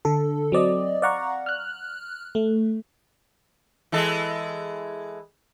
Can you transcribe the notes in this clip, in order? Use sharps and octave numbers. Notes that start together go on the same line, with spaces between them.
D3 A4
F#3 C4 D5 D#5
D5 F5 F#5 A#5 C#6
F6 F#6
A3
E3 G#3 A4